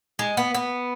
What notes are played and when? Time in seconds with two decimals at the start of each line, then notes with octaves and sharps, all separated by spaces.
0.19 G#3
0.37 B3
0.54 B3